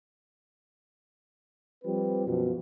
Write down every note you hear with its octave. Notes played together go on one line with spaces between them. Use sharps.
F3 G3 C4 B4
F#2 B2 F3